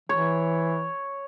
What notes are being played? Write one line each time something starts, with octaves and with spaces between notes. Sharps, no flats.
E3 C#5